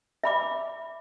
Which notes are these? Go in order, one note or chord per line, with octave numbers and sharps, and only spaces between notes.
E5 B5 D6